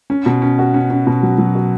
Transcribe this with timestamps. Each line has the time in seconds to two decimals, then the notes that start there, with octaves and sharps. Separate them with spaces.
0.10 C#4
0.26 B2
0.42 C#4
0.59 F#4
0.74 C#4
0.90 C#4
1.07 B2
1.23 F#3
1.38 F#3
1.55 F#4